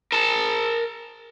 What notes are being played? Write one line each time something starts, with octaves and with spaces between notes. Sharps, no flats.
A#4 A5